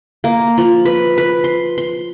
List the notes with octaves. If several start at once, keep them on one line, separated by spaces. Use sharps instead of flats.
A#3
F3
B4
B4
C6
C6